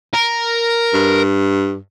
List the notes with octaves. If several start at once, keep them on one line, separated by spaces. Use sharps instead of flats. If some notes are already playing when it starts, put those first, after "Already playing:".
A#4
G2